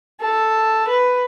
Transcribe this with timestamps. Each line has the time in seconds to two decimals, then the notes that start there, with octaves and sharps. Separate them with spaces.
0.21 A4
0.88 B4